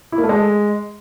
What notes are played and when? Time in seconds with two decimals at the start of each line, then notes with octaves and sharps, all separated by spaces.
0.12 E4
0.18 A#3
0.24 A3
0.29 G#3